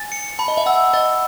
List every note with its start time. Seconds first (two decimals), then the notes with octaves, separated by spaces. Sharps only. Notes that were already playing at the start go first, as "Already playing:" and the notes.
Already playing: G#5 A6
0.12 C#7
0.39 A5 B5
0.48 D#5
0.57 E5
0.66 F#5 E6
0.94 D#5 A6